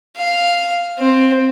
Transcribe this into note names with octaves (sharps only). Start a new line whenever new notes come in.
F5
C4